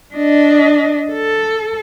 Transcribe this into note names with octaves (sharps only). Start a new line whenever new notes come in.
D4 D#5
A4